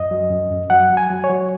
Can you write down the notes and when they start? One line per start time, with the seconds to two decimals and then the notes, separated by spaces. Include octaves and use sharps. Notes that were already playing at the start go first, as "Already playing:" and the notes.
Already playing: F#2 D#5
0.11 F#3
0.30 F#2
0.51 F#2
0.70 F#3 F#5
0.90 F#3
0.97 G#5
1.10 F#3
1.24 C#5
1.30 F#3